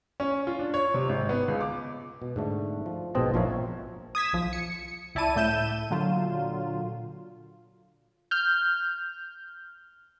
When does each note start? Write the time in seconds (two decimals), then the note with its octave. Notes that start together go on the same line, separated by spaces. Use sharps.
0.20 C#4
0.47 F4
0.59 D4
0.74 C#5
0.94 C3
1.09 G#1
1.29 B3
1.48 C#2
1.61 D6
2.22 B2
2.36 G#2 D3 A3
2.86 F3
3.15 A#1 G#2 B2 C4 D#5 A5
3.34 A#1 F3 A#4 C#5 E5
4.15 D#6 G#6 B6 E7
4.33 B1 F3
4.53 C#7
5.15 C#2 E4 D5 A5 D#7
5.36 C#2 A2 E5 G6 D#7 E7
5.90 A#2 D3 F#3 F4
8.31 F6 G6